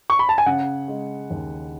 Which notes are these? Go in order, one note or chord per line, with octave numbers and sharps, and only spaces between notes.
C#6
B5
A5
G#5
C#3 F#5
G#3
D#2